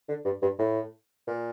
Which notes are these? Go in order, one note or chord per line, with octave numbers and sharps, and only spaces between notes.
D3
G2
G2
A2
A#2